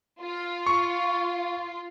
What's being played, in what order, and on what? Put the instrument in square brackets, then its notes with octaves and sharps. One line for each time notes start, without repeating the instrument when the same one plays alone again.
[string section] F4
[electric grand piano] C#6